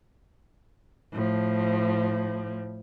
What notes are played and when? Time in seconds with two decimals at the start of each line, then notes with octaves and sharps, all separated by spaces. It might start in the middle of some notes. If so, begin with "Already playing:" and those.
1.12 A2 F3